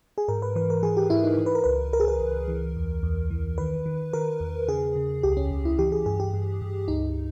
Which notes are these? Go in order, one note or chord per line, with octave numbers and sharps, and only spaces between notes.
G#4
G#2 A#4
B4
E3 B4
A#4
E3 G#4
G4
G#2 E4
D#4
E3
B4
A#4
C#2 B4
C#2 A#4
G#4
A#4
C#2
E3
E2
E2
E3
D#3 B4
D#3
D#3 A#4
E2
C#3 G#4
C#3
C#2 G4
C#4
C#2
E4
E3 G4
G#4
G2 G#4
G4
G2
G2
C#2 D#4